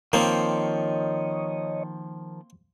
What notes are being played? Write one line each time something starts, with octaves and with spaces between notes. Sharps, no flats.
D#3 F3 A#3 C4 C#5 D#5